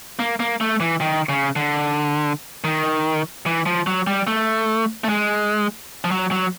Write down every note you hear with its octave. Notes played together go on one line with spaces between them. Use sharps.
A#3
A#3
A3
E3
D#3
C#3
D3
D#3
E3
F3
F#3
G3
A3
A3
G#3
F3
F#3
F#3